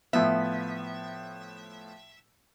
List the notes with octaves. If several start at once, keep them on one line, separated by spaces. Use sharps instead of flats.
A2 F3 B3 E5